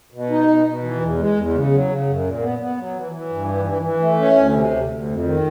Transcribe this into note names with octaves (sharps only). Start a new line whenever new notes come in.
B2
D#4
B2
B2
E3
E2
G#3
E2
C#3
F#3
C#3
F#2
A#2
B3
B3
F#3
E3
E3
G2
E3
E3
E3
A3
C#4
D2
C3
D2
D2
F2
D#3